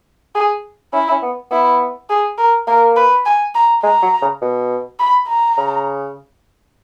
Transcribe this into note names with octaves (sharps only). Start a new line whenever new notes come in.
G#4
C#4 E4
C#4
B3
B3 E4
G#4
A#4
A#3 A#4
B4
G#5
A#5
G#3 A#5
F#3
C#3
B2
B5
A#5
C#3